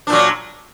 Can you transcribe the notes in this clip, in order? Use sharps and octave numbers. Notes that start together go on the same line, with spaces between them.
A#2 F#3 D4